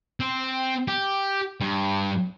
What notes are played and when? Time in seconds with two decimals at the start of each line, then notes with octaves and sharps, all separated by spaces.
0.20 C4
0.88 G4
1.60 G2